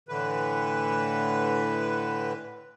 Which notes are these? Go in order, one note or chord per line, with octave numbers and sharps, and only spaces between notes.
A2 D3 E3 B4